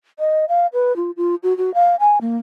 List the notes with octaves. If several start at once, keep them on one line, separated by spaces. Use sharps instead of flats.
D#5
F5
B4
F4
F4
F#4
F#4
F5
G#5
A#3